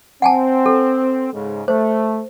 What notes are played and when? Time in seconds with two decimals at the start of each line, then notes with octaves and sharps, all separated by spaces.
0.22 C4 F#5 G#5 A5
0.66 A4
1.33 G#2 C#3
1.68 A3 C5